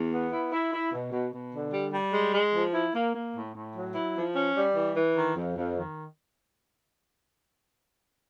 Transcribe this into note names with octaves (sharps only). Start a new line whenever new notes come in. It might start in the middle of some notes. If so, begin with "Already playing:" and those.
Already playing: E2
B3
E4
E4
E4
B2
B2
B2
D3
G3
G3
G#3
G#3
F3
E4
A#3
A#3
A2
A2
F#3
E4
F3
C#4
G3
E3
E3
D#3
F2
F2
D#3